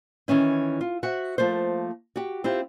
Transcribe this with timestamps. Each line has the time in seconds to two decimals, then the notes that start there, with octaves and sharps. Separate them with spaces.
0.28 D#3 E3 C#4 E4
0.81 F4
1.03 F#4 C5 E5 F#5
1.38 F3 A3 A#3 C5
2.16 F#4 G4
2.44 C4 E4 F4 G4